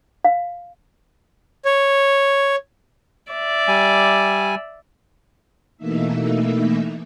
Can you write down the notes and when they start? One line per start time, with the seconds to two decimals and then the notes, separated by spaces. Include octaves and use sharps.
0.25 F5
1.65 C#5
3.32 D5 E5
3.68 G3 G#5
5.77 B2 E3 A3 A#3 D#4 E5